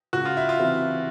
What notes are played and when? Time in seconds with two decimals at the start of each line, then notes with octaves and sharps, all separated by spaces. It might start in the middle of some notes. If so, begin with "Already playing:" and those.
0.13 C#2 F#4
0.25 F4
0.37 E4
0.49 F4
0.59 C3 E3